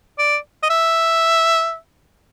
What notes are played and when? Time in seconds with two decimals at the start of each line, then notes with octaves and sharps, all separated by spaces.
0.19 D5
0.63 D#5
0.70 E5